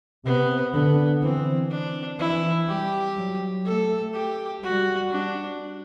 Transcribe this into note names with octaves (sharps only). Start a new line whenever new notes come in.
C3 B3
D3 B3
E3 C4
D4
E3 E4
G3 G4
F#3
A3 A4
G4
G3 F#4
D4